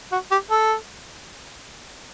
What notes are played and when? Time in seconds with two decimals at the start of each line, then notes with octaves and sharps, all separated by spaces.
0.12 F#4
0.31 G4
0.50 A4